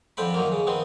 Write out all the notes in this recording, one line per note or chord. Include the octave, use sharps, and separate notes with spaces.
F2 D3 C4 G5 B5
D#3 F#3 A#3
C#3
D#3 B3 C4